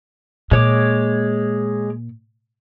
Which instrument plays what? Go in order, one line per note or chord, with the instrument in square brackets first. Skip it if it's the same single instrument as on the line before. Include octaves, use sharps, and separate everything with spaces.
[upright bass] A#2 [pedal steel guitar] G#3 C#5 D6